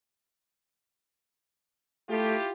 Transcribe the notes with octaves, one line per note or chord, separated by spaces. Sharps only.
A3 E4 F4 G4